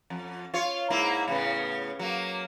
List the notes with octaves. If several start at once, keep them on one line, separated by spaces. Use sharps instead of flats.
F2
F4 C#5
G#2 A#3 E4
A2 C#3 B3
F#3 A#3